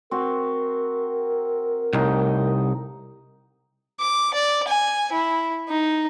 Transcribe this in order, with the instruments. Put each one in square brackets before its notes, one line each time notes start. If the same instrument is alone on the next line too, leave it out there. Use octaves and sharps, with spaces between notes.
[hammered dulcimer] C4 F#4 [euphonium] A#4
[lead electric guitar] C2 [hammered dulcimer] A2 D#4 G5
[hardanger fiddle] D6
D5
G#5
E4
D#4